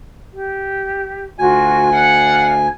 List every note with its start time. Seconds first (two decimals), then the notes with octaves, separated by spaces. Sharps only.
0.33 G4
1.39 D2 F4 F#4 G#5
1.92 D5 F5 F#5